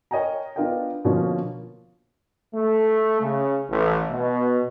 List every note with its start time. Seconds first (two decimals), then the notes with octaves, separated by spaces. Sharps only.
0.11 A#4 C#5 D#5 G5 G#5 A#5
0.56 B3 D4 F4 A#4 D#5 G5
1.05 B2 D3 F3 A#3 C#4 F4
2.55 A3
3.21 C#3
3.69 A1
4.10 B2